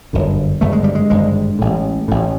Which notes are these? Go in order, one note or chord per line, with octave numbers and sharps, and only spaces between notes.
G1 F#2 D3
G#1 G2 D3 A3
G#3
G3
G#3
G#1 G2 D3 G#3
A1 A2
A1 A2